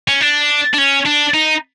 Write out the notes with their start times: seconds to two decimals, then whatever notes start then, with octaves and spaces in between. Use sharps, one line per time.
0.08 C#4
0.21 D4
0.74 D4
0.78 C#4
1.06 D4
1.34 D#4